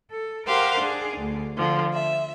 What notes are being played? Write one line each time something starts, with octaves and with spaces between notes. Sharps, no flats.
A4
G4 A#4 C5 F5 F#5
D4 G#4
D2
D3 F3
E5